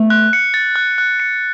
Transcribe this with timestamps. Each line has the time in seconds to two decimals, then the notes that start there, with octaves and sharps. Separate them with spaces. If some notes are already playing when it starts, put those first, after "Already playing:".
Already playing: A3 B3
0.10 F#6
0.33 C#7
0.54 A6
0.76 F#6
0.98 F#6
1.20 C#7